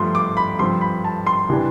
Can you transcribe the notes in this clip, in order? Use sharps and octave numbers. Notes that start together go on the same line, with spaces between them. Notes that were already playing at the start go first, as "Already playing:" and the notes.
Already playing: G2 F3 A3 C6
D6
B5
G2 F3 C4 C6
B5
A5
C6
C3 E3 G3 D4